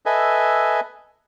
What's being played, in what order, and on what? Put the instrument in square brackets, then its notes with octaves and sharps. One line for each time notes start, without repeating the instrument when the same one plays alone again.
[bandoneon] A4 B4 D#5 E5 G#5